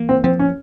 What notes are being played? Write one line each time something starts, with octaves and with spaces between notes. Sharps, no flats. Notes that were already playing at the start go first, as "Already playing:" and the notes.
Already playing: E3 A#3
C4
F3 C4
C#4